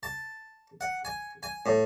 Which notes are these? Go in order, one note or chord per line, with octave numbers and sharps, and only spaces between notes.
A5
F#5
G#5
G#5
A2